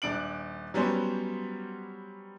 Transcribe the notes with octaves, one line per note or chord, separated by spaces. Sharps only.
D#1 D4 D7 F#7
F#3 G3 B3 C#4 C5